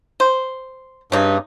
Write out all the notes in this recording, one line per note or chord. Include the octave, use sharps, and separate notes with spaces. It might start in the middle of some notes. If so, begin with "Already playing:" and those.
C5
G2 C#3 D#4